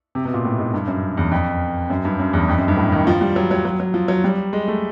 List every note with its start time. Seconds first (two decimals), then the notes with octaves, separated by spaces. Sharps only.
0.15 C3
0.25 B2
0.34 A#2
0.44 A2
0.58 G#2
0.74 G2
0.87 F#2
1.17 E2
1.31 F2
1.90 F#2
2.05 G2
2.19 F#2
2.33 E2
2.48 F2
2.58 F#2
2.68 G2
2.77 A2
2.92 D#3
3.07 F3
3.21 G3
3.36 F#3
3.51 F#3
3.65 F#3
3.80 F#3
3.94 F3
4.08 F#3
4.24 G3
4.53 G#3
4.68 A3